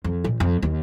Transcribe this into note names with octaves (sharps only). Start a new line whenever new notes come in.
F2
A#1
F2
D#2